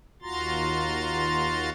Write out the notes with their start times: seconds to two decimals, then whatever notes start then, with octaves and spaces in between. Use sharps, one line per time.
0.22 D#2 F4 F#4 A#5 C6 A6